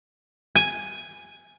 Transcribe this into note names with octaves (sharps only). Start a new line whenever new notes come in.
G#5